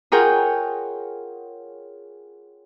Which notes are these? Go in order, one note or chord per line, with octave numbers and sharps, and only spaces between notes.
F4 G#4 A#4 C#5 F#5 G5